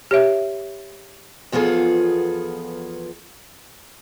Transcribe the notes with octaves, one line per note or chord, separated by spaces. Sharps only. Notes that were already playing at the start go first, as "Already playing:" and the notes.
G4 C#5 E5
E2 F3 B3 F4 G#4 A4